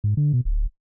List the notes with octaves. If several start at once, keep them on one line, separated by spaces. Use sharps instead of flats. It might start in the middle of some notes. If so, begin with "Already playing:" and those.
G#2
D3
B2
D1